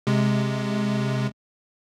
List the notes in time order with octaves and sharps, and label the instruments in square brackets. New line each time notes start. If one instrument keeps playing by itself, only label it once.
[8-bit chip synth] C3 G#3